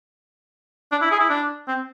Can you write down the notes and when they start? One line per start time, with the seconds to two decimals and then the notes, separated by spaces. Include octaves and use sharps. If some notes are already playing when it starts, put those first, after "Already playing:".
0.92 D4
1.02 E4
1.11 G#4
1.20 E4
1.30 D4
1.68 C4